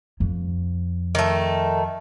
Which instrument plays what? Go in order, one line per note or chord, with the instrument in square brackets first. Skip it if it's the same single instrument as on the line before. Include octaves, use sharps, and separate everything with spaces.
[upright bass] F2
[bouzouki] D#3 A3